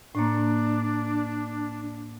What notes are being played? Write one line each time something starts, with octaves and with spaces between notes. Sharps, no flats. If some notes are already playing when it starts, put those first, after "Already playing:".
A2 A#3 D4